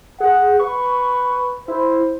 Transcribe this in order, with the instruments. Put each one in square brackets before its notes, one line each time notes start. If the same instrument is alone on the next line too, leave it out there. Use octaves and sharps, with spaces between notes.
[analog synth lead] G#4 [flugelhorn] F#5
[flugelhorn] B4 [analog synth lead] C#6
[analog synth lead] E4 [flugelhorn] C5